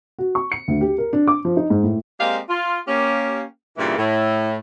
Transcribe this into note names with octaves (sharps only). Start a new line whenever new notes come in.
F#4
C#6
C#7
D2
G4
A#4
D4
D6
F3
D#4
G#2
A2
G#3 A#3 C4 G4 D5 F5
F4
A#3 C#4 G4
G2 A#2 C#3 E3
A2